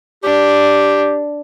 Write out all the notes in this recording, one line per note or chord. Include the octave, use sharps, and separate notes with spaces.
D4 G4